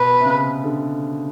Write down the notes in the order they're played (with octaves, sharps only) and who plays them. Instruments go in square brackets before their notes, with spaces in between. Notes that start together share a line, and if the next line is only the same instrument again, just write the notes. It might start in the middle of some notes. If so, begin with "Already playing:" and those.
Already playing: [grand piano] B2 [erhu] B4
[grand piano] C3
C#3
D3